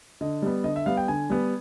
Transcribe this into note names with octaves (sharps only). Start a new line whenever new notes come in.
D3 D#5
G3 B3
D3 D#5
E5
G3 B3 F5
G5
D3 G#5
G3 B3